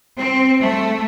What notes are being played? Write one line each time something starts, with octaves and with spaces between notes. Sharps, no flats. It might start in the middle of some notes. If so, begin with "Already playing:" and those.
C4
A3